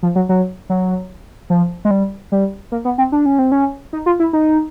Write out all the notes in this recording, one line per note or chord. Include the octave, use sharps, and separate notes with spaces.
F3
F#3
F#3
F#3
F3
G#3
G3
G3
A#3
B3
C4
D4
C#4
C4
C#4
D#4
F4
E4
D#4